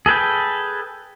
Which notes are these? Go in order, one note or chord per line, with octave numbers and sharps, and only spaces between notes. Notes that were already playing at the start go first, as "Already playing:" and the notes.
G#4 A4 B4 G5